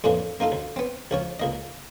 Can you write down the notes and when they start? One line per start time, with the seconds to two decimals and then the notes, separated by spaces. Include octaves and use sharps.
0.04 F2 A2 D3 E3 A#3
0.40 A#3 D#4 F4 A4
0.52 D2
0.76 B3 C4
1.11 C#2 F3 C#5
1.40 C#2 A#3 D#5